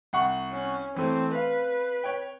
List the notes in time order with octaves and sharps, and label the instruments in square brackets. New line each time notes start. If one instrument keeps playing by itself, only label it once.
[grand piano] C2 F#5 C#6
[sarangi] C#4
[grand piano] E3 A3 [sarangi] C4
[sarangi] B4 [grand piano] F5
[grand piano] C#5 G5